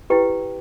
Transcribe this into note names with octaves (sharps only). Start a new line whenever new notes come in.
E4 G4 B4 G5